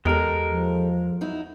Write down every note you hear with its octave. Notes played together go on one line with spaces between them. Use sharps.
E2 G#3 G4 A4 A#4
F3
F#3 D#4 E4